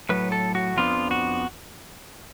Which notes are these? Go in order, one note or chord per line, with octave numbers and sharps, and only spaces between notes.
A2 F#3 A3 B4
A4
F#4
F2 F3 B3 D4 F4
F#4